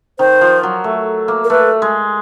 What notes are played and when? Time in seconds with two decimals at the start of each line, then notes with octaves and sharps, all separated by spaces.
0.19 D#3 C5
0.41 F3
0.63 F#3
0.84 A3
1.28 A#3
1.44 A#4
1.50 A3 B4
1.82 G#3